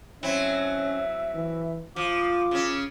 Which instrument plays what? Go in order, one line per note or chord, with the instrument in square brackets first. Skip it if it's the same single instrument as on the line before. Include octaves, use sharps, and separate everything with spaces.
[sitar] F#3 C4 E4 [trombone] C#4 [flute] E5
[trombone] E3
[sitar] F3 [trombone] F4 [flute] D6
[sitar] C#3 C#4